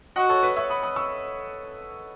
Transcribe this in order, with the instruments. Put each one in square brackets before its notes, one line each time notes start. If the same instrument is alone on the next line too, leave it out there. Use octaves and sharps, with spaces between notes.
[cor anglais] F#4 [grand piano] D#5 F#5
[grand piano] A4 C#5
B4
C#5 E5
B5 D#6
B5 D#6
C#6 E6